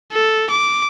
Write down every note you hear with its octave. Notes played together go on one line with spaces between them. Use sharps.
A4
D6